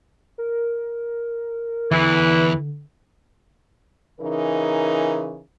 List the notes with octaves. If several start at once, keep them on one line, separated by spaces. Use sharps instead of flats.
A#4
E2 D3 E3
C#3 E3 D#4 A#4